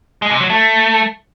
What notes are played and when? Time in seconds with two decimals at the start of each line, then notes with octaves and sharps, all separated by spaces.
0.22 G#3
0.31 C3
0.40 F#3
0.50 A3